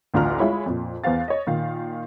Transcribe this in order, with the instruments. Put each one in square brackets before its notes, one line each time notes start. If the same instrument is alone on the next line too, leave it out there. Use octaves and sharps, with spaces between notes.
[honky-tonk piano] A1 D2 D4 F4 A#5 F6
G#3 E4 F4 C#5 B5
F2 A#2
E2 B3 C5 F5 A6
C#5 D#5
A#2 D#3 F5